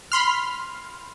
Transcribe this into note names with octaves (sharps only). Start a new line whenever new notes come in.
B5 C6 F6